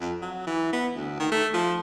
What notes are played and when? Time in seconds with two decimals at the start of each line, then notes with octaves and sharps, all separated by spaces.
0.01 F2
0.22 F#3
0.47 E3
0.73 B3
0.96 D2
1.19 D#3
1.32 A3
1.54 F3